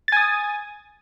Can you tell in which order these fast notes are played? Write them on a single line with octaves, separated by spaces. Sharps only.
A6 G#5 D#6